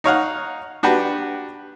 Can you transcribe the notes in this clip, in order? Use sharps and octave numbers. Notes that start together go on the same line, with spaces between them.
D#4 C#5 F5 F#5
D4 F#4 G4 B4